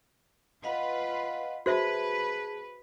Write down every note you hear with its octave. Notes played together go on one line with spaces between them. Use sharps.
F4 B4 D#5 F5 F#5
F#4 G#4 B4 C5 E5 A5